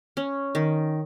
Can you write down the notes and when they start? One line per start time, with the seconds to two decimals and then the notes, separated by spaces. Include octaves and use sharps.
0.17 C#4
0.55 D#3